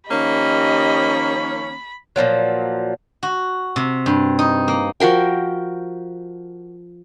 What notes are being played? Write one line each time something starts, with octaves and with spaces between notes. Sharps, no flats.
D#3 F3 A#3 C#4 G4 D#5 B5
A#2 D3 F3 F#3
F#4
C3
G2
D#4
A#3
F3 F#4 A#4 G5